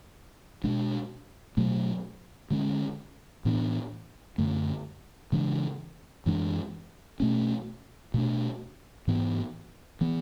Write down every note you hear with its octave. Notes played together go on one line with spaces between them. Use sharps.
B2 G#3 D4
B2 F#3 A3
D3 G#3 C#4
A2 E3 B3 D4
F#2 D3 A3
C#3 E3 G#3 D4
F#2 E3 G#3 D4
B2 A3 C#4
B2 A3 D4
G#2 E3 B3
E3 B3